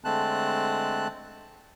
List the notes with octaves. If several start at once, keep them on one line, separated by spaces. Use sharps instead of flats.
D3 G#3 A3 C4 A5 F#6